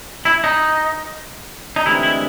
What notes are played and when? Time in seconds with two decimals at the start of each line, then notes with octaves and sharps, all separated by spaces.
0.25 E4
0.44 D#4
1.76 D#4
1.85 D2 C3 E3 G#3 E4
2.03 E4